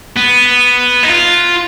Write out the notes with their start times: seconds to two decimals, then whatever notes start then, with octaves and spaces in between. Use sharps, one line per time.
0.16 B3
1.03 D#4
1.08 F4